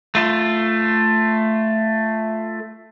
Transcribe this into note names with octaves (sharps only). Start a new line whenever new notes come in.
A3 F4